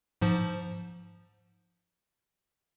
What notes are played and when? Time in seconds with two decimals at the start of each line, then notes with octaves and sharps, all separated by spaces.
0.22 G#2 F3